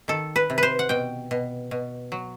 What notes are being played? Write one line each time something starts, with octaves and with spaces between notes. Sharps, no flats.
D#3 A4
B4
C3
B4 C5
F#5
B2 G5
B2
B2
F#3